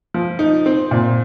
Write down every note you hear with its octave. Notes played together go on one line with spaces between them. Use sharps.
F3
D#4
C4
A#2